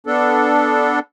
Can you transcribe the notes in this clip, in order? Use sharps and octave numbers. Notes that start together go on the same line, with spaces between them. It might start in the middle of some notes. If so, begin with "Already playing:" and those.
B3 D4 A4